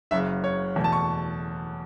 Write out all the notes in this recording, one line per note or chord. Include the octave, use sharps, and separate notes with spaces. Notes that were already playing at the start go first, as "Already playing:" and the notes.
F#1 F#2 C#3 E5
C#5
E2 B2 A3
A5
C#6